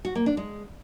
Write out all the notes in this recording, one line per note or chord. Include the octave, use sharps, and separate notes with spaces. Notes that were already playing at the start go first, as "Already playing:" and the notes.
F#4
A#3
D4
G#3